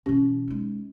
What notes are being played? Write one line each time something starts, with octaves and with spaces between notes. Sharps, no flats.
B2 E3 C#4 G4
G#3 D#4